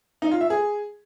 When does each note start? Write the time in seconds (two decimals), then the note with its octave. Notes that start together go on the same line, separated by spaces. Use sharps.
0.22 D#4
0.31 F4
0.41 E5
0.50 G#4